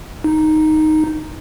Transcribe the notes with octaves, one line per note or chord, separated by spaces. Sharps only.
D#4